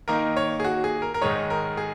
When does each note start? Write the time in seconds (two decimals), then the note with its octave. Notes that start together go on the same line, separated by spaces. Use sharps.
0.08 D#3 A#3 D#4 A#4
0.37 C#5
0.60 G#4
0.64 F#4
0.84 G#4
1.02 A#4
1.14 A#4
1.21 G#2 D#3 G#3 D#4 C#5
1.50 A#4
1.77 G#4